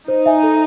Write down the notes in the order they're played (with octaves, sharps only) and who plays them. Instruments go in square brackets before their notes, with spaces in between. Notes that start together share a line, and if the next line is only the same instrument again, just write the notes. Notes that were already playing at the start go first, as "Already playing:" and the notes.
[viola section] D#4 [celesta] C5
[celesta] E5 G#5
A4